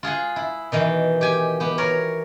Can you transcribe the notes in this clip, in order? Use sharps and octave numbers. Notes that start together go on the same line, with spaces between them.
F4 G#4 F#5 G#5
E4
B2 D#3 E3
G4 G#5
B3 G4
A#4 C#5